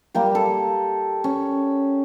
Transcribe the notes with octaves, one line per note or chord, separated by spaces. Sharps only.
G3 A#3 G4
A4
C#4